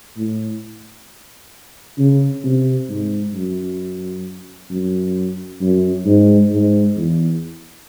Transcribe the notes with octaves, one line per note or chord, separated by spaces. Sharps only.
A2
C#3
C3
G#2
F#2
F#2
F#2
G#2
G#2
E2